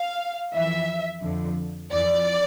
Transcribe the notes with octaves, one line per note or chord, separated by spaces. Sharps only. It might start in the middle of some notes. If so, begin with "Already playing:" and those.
Already playing: F5
F2 E3 E5
F2 D3 F3
F2 E3 D5